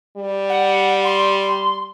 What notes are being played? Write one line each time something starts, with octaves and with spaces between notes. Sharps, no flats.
G3
F#5
C6